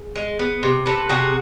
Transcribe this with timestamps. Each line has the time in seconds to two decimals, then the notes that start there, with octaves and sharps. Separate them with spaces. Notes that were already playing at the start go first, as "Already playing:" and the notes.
Already playing: G#4
0.16 G#3
0.39 B3
0.63 C3
0.86 C3 A4 B4
1.09 C3 F#4 G#4